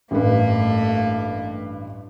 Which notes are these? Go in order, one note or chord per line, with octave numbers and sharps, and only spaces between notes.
A1 G2 A3 A#3 B4